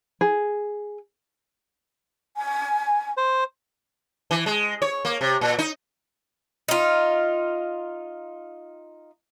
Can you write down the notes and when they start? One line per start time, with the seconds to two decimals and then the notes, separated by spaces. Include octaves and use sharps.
0.21 G#4
2.37 G#5
3.17 C5
4.31 E3
4.46 G#3
4.82 C#5
5.05 A#3
5.21 C3
5.41 A#2
5.59 D#4
6.68 D#4 F4